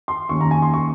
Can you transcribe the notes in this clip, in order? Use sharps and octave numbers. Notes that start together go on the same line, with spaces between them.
C6
D#2 D#3 A#3 C#4 C#6
A#5
G#5
C6
C#6